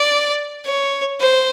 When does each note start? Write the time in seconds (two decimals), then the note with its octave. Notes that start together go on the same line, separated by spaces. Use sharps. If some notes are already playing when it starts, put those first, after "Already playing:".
Already playing: D5
0.65 C#5
1.20 C5